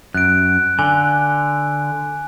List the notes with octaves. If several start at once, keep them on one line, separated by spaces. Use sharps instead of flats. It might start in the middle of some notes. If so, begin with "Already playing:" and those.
F#2 F#6 D7
D3 G#5